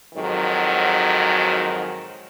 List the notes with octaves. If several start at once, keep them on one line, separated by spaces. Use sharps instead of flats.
F2 G#2 D#3 F#3